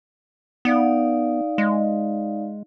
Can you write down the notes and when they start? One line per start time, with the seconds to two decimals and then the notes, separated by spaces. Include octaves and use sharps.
0.65 B3 D#4 D5 F5
1.58 G#3